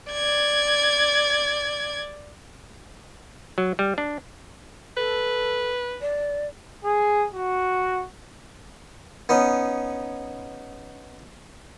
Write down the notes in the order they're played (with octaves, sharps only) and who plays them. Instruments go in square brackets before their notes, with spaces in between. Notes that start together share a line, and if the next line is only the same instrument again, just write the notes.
[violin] D5 G#6
[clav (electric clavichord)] F#3
G3
D4
[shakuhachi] A4 [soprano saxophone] B4
[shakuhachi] D5
[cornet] G#4
F#4
[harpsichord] B3 C#4 D#4